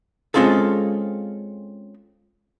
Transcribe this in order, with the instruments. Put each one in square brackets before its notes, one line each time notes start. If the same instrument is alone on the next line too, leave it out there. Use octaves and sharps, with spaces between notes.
[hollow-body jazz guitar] G#3 C4 C#4 F4 G#4 A4